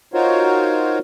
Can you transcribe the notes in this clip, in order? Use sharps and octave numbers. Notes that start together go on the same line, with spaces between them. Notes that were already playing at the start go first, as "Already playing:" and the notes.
D#4 F4 F#4 A#4 C5 C#5